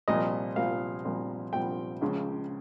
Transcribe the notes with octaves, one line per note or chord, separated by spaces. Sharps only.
C2 A#2 F3 D#5
C2 A#2 F3 F5
C2 A#2 F3
C2 A#2 F3 G5
C#2 C#3 F3